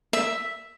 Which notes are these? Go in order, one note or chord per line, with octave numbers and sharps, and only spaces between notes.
E5